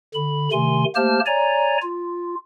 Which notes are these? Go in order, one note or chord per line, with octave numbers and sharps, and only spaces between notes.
D3 B5
C3 D#3 A3 G#5 C6
A3 A#3 G4 C5 A5 F6
C#5 D5 G#5 A#5
F4